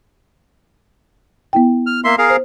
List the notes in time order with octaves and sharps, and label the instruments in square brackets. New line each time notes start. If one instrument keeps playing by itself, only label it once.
[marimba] B3 E4 G5
[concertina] F6
A#3 E5 C6
G#4 A#4 F5
[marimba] C5